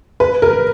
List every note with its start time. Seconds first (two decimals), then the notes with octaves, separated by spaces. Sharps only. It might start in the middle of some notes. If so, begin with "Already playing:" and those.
0.20 B4
0.42 A#4